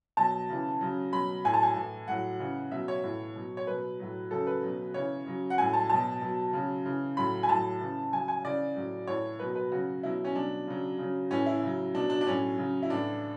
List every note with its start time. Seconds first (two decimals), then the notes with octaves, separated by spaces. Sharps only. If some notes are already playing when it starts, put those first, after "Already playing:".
0.17 B2 F#3 A5
0.50 C#3 E3
0.81 C#3 F#3
1.13 B2 F#3 B5
1.45 A2 F#3 G#5
1.54 A5
1.63 G#5
1.76 A2 E3
2.08 A2 F#3 F#5
2.40 C#3 E3
2.71 B2 F#3 E5
2.88 C#5
3.04 A2 E3
3.36 B2 F#3
3.57 C#5
3.67 B2 F#3 B4
4.00 A2 F#3
4.31 C#3 F#3 A4
4.47 B4
4.62 B2 F#3
4.94 C#3 E3 C#5
5.26 C#3 F#3
5.50 F#5
5.58 A2 F#3 G#5
5.73 A5
5.90 B2 F#3 A5
6.22 B2 F#3
6.53 C#3 F#3
6.86 C#3 E3
7.17 A2 F#3 B5
7.43 G#5
7.49 A2 F#3 A5
7.80 C#3 E3
8.12 C#3 F#3 G#5
8.28 G#5
8.45 C#3 E3 D5
8.76 A2 F#3
9.07 A2 E3 C#5
9.39 B2 F#3 B4
9.55 B4
9.72 C#3 F#3 F#4
10.03 B2 F#3 E4
10.25 C#4
10.35 B2 F#3 D4
10.68 C#3 F#3
10.98 C#3 F#3
11.31 A2 E3 C#4
11.46 E4
11.63 C#3 F#3
11.94 B2 F#3 D4
12.10 D4
12.21 D4
12.26 A2 F#3 C#4
12.58 C#3 F#3
12.83 E4
12.90 A2 E3 D4